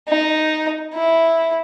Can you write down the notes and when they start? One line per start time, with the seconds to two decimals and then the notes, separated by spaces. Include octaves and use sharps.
0.09 D#4
0.94 E4